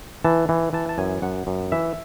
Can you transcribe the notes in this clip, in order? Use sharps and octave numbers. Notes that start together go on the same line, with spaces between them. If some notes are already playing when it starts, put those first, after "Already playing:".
E3 A5
E3
E3 A5
A5
F#2 G#5
F#2 F#5
F#2
E3 E5